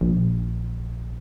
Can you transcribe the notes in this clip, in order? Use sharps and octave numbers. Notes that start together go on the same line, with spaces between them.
A#1